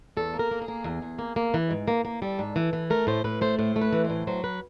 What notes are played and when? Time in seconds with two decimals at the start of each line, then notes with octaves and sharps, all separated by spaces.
0.17 E2 A4
0.34 A#3
0.39 A#4
0.51 A#3
0.62 G#4
0.68 A#3
0.84 E2
1.02 E2
1.19 A#3
1.36 A#3
1.54 E3
1.71 G#2
1.88 A#3
2.05 A#3
2.22 G3 A4
2.39 G#2
2.56 E3
2.73 E3
2.90 A3 A#4
3.07 A2 C5
3.24 A2 B4
3.41 A3 C5
3.59 A2 C5
3.76 A3
3.81 B4
3.93 E3
4.04 C5
4.10 A2
4.27 F#3 C5
4.44 B4